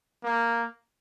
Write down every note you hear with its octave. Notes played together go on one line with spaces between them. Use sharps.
A#3